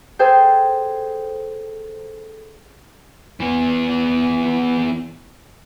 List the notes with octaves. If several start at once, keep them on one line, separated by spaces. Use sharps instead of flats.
G#4 A4 C5 G5
E3 B3